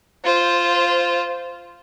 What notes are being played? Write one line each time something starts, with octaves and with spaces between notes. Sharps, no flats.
F4 C5